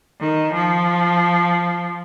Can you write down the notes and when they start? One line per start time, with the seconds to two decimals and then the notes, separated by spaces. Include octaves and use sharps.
0.20 D#3
0.53 F3